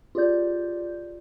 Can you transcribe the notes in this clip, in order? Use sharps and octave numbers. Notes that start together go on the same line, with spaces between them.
F4 G4 G#4 D5 G6